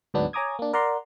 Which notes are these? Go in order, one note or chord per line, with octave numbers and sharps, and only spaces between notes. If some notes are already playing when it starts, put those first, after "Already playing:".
D2 G#2 F#3 B3 D4
C#5 G#5 A#5 D6 D#6 G#6
A#3 D4
A#4 D5 F#5 A#5 C6